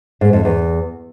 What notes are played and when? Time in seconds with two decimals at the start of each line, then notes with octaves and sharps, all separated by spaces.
0.21 G#2
0.33 F2
0.45 E2